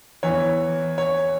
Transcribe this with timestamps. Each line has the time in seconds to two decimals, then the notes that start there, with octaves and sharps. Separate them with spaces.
0.23 E2 E3 C#5
0.98 C#5